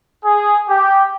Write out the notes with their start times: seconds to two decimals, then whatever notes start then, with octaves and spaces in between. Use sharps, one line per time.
0.24 G#4
0.68 G4